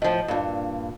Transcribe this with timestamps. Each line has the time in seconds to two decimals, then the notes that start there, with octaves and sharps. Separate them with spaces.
0.02 A2 F3 D#5
0.28 G2 A#2